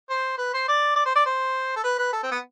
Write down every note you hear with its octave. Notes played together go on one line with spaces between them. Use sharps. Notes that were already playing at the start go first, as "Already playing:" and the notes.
C5
B4
C5
D5
D5
C5
D5
C5
A4
B4
B4
A4
C4
B3